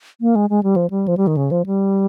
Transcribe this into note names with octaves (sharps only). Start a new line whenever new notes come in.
A#3
G#3
G#3
G3
F3
G3
F3
G3
D#3
C#3
F3
G3